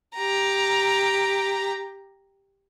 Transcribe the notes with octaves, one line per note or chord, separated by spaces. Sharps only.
G4 A#5